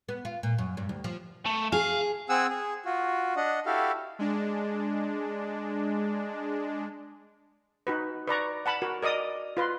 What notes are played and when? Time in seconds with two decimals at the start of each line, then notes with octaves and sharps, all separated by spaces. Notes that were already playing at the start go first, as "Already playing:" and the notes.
0.09 B3
0.25 F4
0.43 A#2
0.58 F#2
0.77 G2
0.89 D2
1.04 F3
1.46 A3
1.72 G#4 F5
2.29 C4 G#4 F#5 G#5 E6
2.50 G#4
2.85 F4 F#4
3.36 D4 D#5 F#5
3.66 E4 F#4 G4 A4 F5
4.19 G#3 D4
7.87 D#4 F#4 B4
8.27 B4 D5 A#5 C#6
8.66 F#5 A5 B5
8.82 F#4 A#4
9.02 A#4 D5 D#5 D#6
9.57 F4 B4 C6